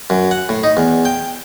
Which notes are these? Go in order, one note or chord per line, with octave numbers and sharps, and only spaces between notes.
F#2
F#5
A2
D#4
E2
G5